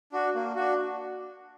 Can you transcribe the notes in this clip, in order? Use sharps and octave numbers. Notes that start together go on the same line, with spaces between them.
D4 F#4
A#3
D4 F#4